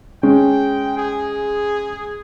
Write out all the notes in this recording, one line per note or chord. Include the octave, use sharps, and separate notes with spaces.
G#3 C#4 G5
G#4